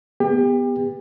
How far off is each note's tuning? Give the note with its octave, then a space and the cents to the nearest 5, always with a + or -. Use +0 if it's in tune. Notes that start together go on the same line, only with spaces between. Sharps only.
B3 +0 G4 +35